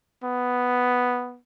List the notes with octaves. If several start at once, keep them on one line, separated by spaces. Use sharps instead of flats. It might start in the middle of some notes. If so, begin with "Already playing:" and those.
B3